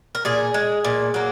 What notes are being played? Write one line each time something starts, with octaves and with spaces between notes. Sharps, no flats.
A#4
A#2 G#4
G#3
A#2
F#3 A#3